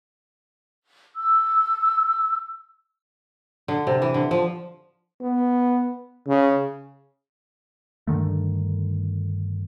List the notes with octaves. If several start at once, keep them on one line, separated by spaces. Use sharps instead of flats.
E6
D3
C3
E3
D3
F3
B3
C#3
G2 D3 D#3 A3